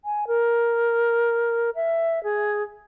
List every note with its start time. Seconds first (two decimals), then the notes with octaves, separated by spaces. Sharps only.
0.05 G#5
0.27 A#4
1.75 E5
2.24 G#4